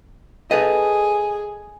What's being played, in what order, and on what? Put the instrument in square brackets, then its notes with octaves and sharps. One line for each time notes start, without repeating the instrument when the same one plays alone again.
[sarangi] G#4 [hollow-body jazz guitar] A4 B4 D#5